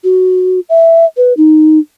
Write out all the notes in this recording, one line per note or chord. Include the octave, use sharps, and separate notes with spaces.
F#4
E5
B4
D#4